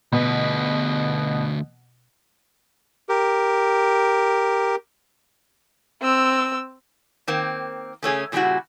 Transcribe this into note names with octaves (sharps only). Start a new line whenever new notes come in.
D2 B2 B4
G4 A#4
C4 E6
D#3 A#3 C4
C#3 A3 C#4 G#4
A#2 C#3 G3 G#3 E4 F#4